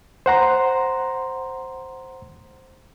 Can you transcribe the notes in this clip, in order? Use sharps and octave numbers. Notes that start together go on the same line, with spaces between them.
C5 F#5 A#5 C6